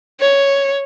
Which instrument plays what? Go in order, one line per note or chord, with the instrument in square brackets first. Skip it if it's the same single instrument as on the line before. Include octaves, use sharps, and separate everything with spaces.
[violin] C#5